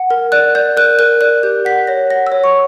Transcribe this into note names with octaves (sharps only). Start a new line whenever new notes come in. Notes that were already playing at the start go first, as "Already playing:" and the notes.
Already playing: F#5
A#4
D5 F#6
D5 G6
A#4 F#6
A#4 F#6
D5 F#6
G4 G6
F#5 B6
C#5 A#6
F#5 A#6
E6
C#5
C#6